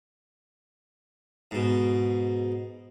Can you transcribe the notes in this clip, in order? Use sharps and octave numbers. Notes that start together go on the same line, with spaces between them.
G#2 B2